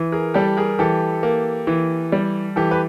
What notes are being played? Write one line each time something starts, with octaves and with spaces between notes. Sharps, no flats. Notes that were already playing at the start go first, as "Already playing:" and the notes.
Already playing: E3
G#4 A#4
G3 G4 A4
G#4 A#4
E3 G4 A4
A#3
E3
G3
E3 G4 A4
B4